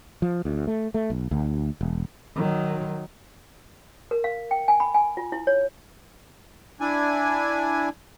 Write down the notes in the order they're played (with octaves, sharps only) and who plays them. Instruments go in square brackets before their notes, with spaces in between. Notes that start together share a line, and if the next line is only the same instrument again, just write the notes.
[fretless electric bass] F3
D2
A3
A3
B1
D2
E1
[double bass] D#3 F#3
[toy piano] A#4
F5
G5
G#5
B5
G#5
F4
E4
C#5
[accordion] D4 E4 G#5